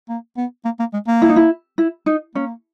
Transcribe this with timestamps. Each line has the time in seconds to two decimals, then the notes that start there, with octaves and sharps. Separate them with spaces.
0.09 A#3
0.37 B3
0.65 A#3
0.79 A#3
0.93 G#3
1.07 A#3
1.22 E4
1.29 D#4
1.36 E4
1.78 E4
2.06 D#4
2.35 A#3 C#4